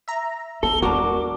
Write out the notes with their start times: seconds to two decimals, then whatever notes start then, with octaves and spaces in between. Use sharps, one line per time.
0.08 E5 A#5
0.63 B3 A4 G7
0.82 E2 G#3 D4 F#4 A#4 D6